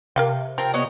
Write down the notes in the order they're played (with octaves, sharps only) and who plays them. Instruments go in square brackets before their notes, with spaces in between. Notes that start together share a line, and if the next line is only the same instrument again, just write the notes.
[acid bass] C3 [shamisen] A#4 F5 G5
[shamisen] F3 [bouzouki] C4 A#4 G5
[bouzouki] B3 C#5 D#5